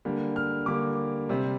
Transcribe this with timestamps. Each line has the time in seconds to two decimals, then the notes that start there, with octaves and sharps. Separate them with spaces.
0.05 D3 G3 A#3
0.36 F6
0.66 D3 G3 A#3 D6
1.29 C3 G3 C4